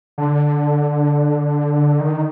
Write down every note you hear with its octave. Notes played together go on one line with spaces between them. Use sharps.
D3
D#3